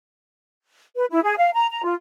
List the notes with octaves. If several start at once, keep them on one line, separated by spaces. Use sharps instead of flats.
B4
E4
G#4
F5
A#5
A#5
F4